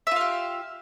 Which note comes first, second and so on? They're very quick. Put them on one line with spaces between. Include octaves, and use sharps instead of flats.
E5 F4 F5 G4